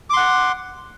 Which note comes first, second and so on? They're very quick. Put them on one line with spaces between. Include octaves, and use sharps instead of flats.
D6 C6 F#5